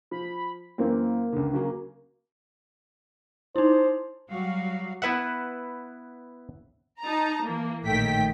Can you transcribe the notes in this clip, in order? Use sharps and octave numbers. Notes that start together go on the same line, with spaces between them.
F3 B5
F#2 E3 A#3 C4
C#2 D3
C#3 F#3 A#3
D#4 E4 C5
F#3 G3 F#4 F5
B3 E4 B4 E5 F#5
D#4 A5 A#5
E3 A#3
A#1 A2 D#3 A3 G5 B6